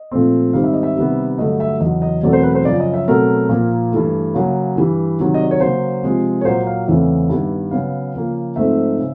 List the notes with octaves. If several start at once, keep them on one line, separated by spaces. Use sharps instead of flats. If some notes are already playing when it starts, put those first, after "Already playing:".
Already playing: D#5
A#2 F3 A3 C4
G#2 D#3 G3 C4 F5
E5
D#5
E5
C3 D#3 G3 B3
G2 D3 F#3 A3 D#5
E5
E2 C#3 F#3 D#5
D#5
E2 B2 F#3 A3 C4 D5
C5
B4
C5
F#2 C#3 F3 D5
D#5
E5
B2 F#3 A3 C4 A#4
A#2 F3 A#3
G2 E3 A3
C#3 F#3 A#3
G2 E3 G3
C3 D#3 F#3
D#5
D5
C#5
C#3 F#3 A#3 C5
C3 F3 G#3 C4
C#5
A#2 F#3 A#3 C5
F5
E2 C#3 E3 A3 C4 E5
G2 D#3 G3 B3
C#3 F#3 B3 F5
C#3 F3 A#3
G#2 F3 A3 C4 E5
C#3